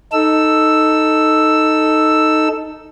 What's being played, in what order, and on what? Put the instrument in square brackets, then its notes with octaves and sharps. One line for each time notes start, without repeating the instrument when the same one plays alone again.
[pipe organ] D#4 A4 E6